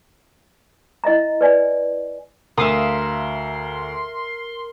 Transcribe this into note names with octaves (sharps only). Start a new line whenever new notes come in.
E4 D#5 E5 A#5
B4 D5 G#5
D2 A#4 E5 F5 C6 D#6